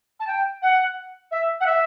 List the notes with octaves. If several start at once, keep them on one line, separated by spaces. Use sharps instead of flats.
A5
G5
F#5
E5
F#5
E5